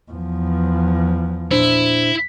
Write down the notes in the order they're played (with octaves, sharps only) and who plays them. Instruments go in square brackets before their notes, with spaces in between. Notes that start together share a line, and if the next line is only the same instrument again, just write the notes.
[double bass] E2 F3
[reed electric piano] A#2 D4 C5 [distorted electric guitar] E4